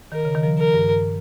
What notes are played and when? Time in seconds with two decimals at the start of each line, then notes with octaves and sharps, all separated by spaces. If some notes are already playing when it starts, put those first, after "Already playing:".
0.12 D#3 A#4
0.25 C#3
0.35 D#3
0.43 F3
0.58 A#4
0.74 G2